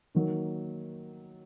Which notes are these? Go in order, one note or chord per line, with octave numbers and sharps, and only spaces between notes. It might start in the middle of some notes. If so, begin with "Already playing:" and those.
D#3 F#3 A#3